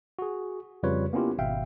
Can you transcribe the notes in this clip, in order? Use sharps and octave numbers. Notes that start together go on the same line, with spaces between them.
F#4 G#4
F2 C#3 G3 F4 B4 C#5
A#3 B3 C#4 E4 F4 G4
G#1 B2 E5 F5 G5